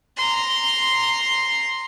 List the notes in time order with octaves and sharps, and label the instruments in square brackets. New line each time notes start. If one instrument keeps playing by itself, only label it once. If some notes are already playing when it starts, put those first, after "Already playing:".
[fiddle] A#5 C6